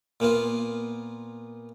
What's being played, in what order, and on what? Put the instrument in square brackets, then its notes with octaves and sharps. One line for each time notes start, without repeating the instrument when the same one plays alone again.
[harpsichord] A#2 A#3 B3 F4